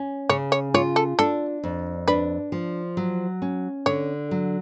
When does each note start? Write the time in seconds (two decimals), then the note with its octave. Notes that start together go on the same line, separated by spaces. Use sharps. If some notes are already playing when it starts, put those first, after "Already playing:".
Already playing: C#4
0.29 C#3 C#5
0.52 C#5
0.74 F4 C#5
0.96 A4
1.19 D4 A4
1.64 F2
2.08 D4 B4
2.52 F3
2.97 F#3
3.42 C#4
3.86 D3 C#5
4.31 F#3